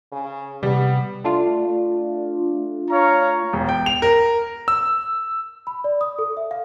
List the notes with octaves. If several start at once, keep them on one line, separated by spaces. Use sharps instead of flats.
C#3
C3 G3 B3
A3 D4 F4
C#5 F5 A#5
E1
G5
F7
A#4
E6
B5
D5
D#6
A4
E5
F5